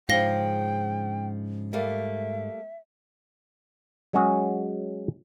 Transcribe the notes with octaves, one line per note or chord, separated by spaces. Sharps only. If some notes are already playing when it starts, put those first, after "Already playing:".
G#2 C#3 F3 D4 F5 G5 A#6 G7
G3 A3 A#3 E5
F#3 G#3 C#4 F#4 G#4